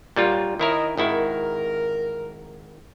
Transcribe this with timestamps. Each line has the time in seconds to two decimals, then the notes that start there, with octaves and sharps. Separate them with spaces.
0.16 A#2 F#3 G3 F4 F#4
0.59 D#3 E4 A#4 C#5 D#5 E5
0.97 G#1 D#3 E4 A#4